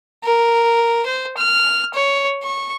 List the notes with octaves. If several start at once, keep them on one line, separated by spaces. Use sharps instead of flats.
A#4
C5
F6
C#5
C#6